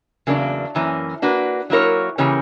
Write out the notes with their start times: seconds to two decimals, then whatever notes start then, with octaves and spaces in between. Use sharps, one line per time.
0.27 E2 C#3 F#3 A#3 D4
0.75 F#2 E3 A#3 C#4
1.22 A#3 D4 F#4 B4
1.70 F#3 A#3 E4 A#4 C#5
2.18 C#3 E3 A#3 C#4 G4